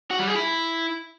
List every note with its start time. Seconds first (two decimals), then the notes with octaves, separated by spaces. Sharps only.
0.11 F#4
0.19 G3
0.28 G#4
0.36 E4